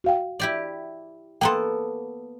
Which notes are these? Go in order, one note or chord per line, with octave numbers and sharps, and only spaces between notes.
F#4 F5 G5
E4 G4 D5
A#3 B3 A4 G5 A#5 C6